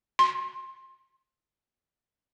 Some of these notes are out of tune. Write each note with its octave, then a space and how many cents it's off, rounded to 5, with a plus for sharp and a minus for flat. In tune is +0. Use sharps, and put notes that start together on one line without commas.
C6 +20